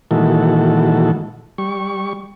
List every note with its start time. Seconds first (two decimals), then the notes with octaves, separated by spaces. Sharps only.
0.11 A#2 D#3 E3 G#3 F#4 A4
1.58 G3 C#6